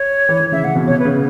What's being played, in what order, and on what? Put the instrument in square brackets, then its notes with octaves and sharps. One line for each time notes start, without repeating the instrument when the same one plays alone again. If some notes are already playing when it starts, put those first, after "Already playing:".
Already playing: [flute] C#5
[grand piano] E3
E3
[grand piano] C#3 [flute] E5
[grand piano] C#3 [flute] F#5
[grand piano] B2
[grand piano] B2 [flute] C#5
[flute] B4
[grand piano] C#3